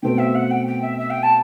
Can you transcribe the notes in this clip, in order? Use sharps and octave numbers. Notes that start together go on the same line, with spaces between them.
B2 A3 C4 F#4 B4 G5
E5
F#5
G5
G5
E5
E5
G5
A5